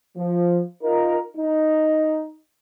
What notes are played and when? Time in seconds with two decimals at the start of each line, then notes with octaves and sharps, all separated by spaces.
0.17 F3
0.83 D#4 F4 A#4
1.37 D#4